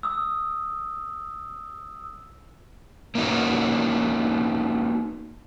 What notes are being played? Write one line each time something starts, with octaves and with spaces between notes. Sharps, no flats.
D#6 E6
A#3 B3 C#4 D#4 F#4